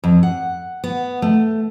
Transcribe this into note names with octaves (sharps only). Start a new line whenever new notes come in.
F2
F#5
B3
A3